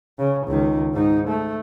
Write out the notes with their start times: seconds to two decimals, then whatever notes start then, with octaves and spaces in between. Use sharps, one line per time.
0.18 C#3
0.47 C#2 D#3
0.93 G#2 D#4
1.28 A3